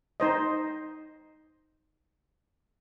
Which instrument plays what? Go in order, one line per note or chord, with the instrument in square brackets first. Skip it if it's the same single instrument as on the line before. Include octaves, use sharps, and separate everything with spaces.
[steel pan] D#4 C5 D#5